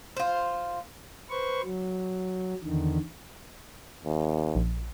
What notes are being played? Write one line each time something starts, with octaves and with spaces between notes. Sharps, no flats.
F4 C5
B4 C5 C#6
F#3
E2 D3 D#3
D#2
A#1